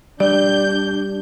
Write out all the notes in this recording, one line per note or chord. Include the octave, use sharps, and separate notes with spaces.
G3 D4 D5 G6